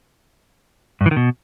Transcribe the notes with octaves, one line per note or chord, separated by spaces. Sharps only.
G2
E3
D#3
B2